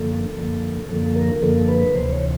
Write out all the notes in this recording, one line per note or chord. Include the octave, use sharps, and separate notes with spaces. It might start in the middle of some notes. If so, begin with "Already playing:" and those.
Already playing: F#2 D3 F3 A#3 A4
F#2 D3 F3 A#3
F#2 D3 F3 A#3 A4
A#4
F#2 D3 F3 A#3 A4
B4
D2 C3 E3 C5
C#5